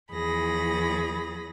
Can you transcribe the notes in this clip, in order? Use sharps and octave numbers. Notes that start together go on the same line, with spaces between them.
E2 F3 G#4 B5 A#6